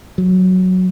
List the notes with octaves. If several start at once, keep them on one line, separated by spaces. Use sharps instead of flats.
F#3